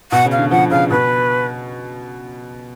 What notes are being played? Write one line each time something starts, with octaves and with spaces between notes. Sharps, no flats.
B2 F#5
C#3
F5
D3
F3 F#5
C#3 F5
B2 B4